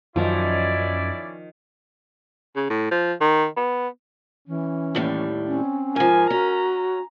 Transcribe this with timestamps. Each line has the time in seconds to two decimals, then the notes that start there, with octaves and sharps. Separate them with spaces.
0.16 F#2 D#3 F3 C#4 E4 A#4 D5 G5
2.56 C#3
2.70 A2
2.91 F3
3.21 D#3
3.57 B3
4.48 E3 C#4
4.95 D#2 A2 G3
5.47 C4 C#4
5.96 G#2 F3 A#4 G#5
6.30 C#4 F#4 A#5